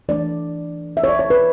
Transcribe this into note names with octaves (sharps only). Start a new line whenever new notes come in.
E3 A3 D4 D5
E5
C#5
D5
C#5
B4